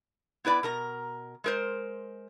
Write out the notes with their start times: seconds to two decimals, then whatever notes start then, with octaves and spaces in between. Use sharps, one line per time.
0.45 B3 E4 B4 D5
0.63 B2 A#4 A#5
1.44 G#3 A#4 C5